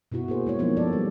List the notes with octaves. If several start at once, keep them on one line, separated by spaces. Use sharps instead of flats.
B2 B3 E4 F#4
A#3 G#4 C5
G#3 E4 C#5
F3 F#3 A#3 B3 C#4 D#4
A#3 A4 D5
G3